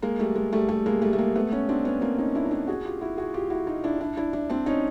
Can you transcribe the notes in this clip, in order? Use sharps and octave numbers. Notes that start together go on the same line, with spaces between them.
G#3 A#3
G3 A3
G#3
G3 A3
G3 A3
G#3 A#3
G3 A3
A3
G#3 A#3
A3 B3
B3 C#4
C4 D4
B3 C#4
A#3 C4
C#4 D#4
D4 E4
D#4
D4 E4
F#4 G#4
F4 G4
E4 F#4
F#4 G#4
F4 G4
E4 F#4
D#4 F4
D4 E4
D4 E4
D4 E4
D4 E4
C4 D4
C#4 D#4